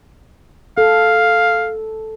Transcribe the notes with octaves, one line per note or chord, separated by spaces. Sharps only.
A4 F5